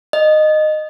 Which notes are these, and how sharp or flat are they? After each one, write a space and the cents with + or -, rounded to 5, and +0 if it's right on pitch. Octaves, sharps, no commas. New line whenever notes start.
D#5 -15